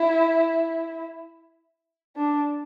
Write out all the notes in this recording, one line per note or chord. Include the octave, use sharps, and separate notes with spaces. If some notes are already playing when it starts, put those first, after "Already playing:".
Already playing: E4
D4